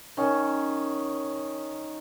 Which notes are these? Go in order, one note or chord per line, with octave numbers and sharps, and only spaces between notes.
D#3 C#4